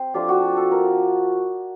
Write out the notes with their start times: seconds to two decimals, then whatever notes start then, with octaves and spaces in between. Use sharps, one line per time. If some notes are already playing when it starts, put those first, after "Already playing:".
Already playing: C4 C5
0.14 F3 A3 D4 F4 G4
0.29 F#4
0.57 A4
0.72 A#4